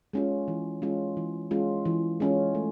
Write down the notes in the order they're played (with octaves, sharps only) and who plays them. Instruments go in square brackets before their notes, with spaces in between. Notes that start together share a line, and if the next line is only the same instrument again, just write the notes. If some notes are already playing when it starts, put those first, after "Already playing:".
[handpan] G#3 C#4 F4
E3
G#3 C#4 F4
E3
G#3 C#4 F4
E3
G#3 C#4 F4
A3